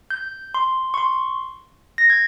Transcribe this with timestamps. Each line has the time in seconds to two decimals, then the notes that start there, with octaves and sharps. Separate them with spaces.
0.10 G6
0.54 C6
0.94 C#6
0.98 C6
1.98 A#6
2.10 G#6